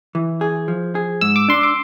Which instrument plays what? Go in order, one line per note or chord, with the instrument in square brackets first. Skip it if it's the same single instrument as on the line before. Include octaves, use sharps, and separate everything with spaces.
[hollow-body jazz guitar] E3
G#4
F3
G#4
[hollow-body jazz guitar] G#2 [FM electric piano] E6
[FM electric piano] D6
[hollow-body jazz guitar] D4 [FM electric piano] C6
[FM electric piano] D6